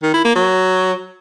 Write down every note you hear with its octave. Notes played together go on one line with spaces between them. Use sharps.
D#3
E4
A#3
F#3